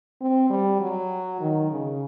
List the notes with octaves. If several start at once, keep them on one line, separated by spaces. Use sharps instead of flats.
C4
G3
F#3
D#3
C#3